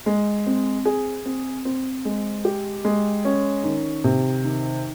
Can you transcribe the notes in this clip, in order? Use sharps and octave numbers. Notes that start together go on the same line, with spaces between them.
G#3
C4
G#4
C4
C4
G#3
G4
G#3
C#4
D#3
C3
D#3